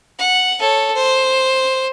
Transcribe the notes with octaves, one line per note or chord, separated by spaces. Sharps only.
F#5
A4 C#5
C5